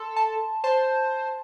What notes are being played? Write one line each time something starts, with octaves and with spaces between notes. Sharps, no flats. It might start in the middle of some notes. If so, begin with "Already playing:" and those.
Already playing: A4 C6
A5
C5 A5